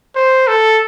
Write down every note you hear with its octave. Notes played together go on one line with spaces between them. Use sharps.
C5
A4